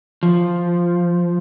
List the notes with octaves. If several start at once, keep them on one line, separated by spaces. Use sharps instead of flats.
F3